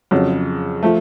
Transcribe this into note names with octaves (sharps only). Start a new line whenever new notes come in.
F2 C#3 F#3
F3 A3